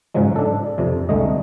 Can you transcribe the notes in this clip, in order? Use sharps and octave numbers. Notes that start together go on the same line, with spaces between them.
G#2 C#3 F3 F#3 G#3
D4 A4
F2 C3
C2 D3 G#3 A3 D#5